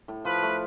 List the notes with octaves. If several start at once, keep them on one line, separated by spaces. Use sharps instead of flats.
A2
F3 B4
A3